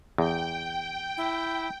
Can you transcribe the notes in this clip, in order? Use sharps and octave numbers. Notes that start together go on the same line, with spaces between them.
E2 G5
E4